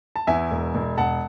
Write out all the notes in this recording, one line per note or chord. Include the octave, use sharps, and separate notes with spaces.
A5
E2 E5 G#5
E1
E1
E1 F#5 A5